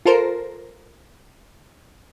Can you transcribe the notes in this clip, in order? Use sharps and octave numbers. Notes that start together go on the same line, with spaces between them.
F4 A4 A#4 C5